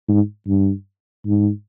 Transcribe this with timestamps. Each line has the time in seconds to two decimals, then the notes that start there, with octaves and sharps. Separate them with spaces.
0.08 G#2
0.47 G2
1.25 G#2